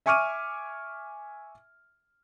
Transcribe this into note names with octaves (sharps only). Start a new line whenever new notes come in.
E5 G#5 C#6 D6 F6 D#7